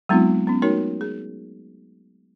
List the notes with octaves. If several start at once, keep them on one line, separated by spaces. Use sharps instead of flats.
F#3 G#3 B3 C4 D#4 F4
B3 C#4
A3 D#4 F#4 A#4 C#5
G#4